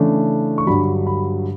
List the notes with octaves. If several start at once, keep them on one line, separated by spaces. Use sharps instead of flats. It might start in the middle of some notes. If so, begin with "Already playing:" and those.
Already playing: C#3 E3 A3 D4
C#6
G2 D3 F#3 B5
B5